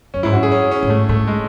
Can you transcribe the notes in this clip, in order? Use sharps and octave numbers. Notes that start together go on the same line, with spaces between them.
F#2 C#4
G#2 E4
F#2 F#4
G#4
C#4
C#4
A2
G#2 A3
A2 A3
G#3